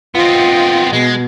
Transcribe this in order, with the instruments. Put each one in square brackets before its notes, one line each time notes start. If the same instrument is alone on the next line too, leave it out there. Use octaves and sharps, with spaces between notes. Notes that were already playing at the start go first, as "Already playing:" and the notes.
[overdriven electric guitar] B3 C4 [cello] F4 D#5
[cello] B2 [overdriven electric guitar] G#3